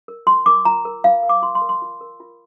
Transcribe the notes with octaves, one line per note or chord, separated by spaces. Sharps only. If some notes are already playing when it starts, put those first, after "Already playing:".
A#4
F4 C6
A#4 D6
F4 A#5
A#4
F4 F5
A#4
D6
F4 C6
C6
A#4
C6
F4
A#4
F4